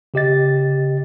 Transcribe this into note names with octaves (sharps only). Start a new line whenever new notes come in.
C#3 G4 D#5 A6